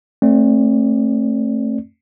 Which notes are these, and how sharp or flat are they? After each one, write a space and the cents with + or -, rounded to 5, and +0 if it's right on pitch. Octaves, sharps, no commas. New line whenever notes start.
A3 +10 C4 +35 D5 +0